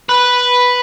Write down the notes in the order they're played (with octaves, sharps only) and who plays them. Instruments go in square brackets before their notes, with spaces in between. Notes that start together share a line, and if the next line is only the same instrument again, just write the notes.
[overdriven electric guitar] B4